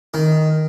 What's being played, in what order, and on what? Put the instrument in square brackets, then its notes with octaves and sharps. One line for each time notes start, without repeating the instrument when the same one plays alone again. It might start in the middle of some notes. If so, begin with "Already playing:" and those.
[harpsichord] D#3